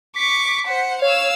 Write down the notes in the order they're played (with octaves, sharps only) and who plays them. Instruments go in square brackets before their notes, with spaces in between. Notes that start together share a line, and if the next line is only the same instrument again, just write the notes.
[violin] C#6 D6 [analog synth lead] B6
[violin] C5 F#5
[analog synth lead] C#5 [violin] F5 E6